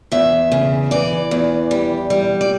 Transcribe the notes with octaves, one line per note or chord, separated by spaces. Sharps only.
E2 E5
C#3
E3 D5
E2
G3
G3
D5